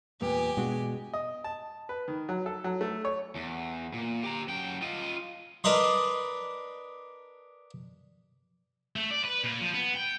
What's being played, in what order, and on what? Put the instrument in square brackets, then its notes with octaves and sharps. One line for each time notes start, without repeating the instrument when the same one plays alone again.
[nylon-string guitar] E2 A#2 B3 [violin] G4 G#5
[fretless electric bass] B2 [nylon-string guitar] G#3 D4 F#4
[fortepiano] D#5
A5
B4
D#3
F#3
A4
F#3
A3
C#5
[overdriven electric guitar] E2
A#2
G4 A#5
F#2 G5
F4 D#5
[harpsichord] D4 A#4 B4 D#5 C6
[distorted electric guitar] A3
D5
B4
A#2
F3
B3
G5